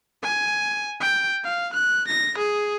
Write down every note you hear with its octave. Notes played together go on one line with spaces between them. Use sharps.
G#5
G5
F5
F#6
A#6
G#4